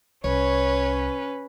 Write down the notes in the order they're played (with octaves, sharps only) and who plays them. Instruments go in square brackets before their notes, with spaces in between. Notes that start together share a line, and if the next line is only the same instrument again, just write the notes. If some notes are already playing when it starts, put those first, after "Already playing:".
[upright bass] C2 [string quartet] C#4 B4 [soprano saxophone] C#5